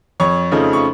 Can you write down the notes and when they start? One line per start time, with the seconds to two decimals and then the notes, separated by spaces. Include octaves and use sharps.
0.20 F2 C#5 C#6
0.52 C#3 F3 A3 D#4
0.73 C#6